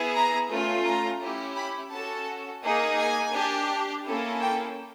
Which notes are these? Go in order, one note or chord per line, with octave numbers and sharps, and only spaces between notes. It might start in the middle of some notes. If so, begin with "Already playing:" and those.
Already playing: B3 E4 G#4
A#5
A3 C#4 F4
A#5
C#4 E4 G4
B5
C#4 F#4 A4 A5
A#3 D#4 G#4
G#5
D4 G4
A#3 C#4 E4 A4
G5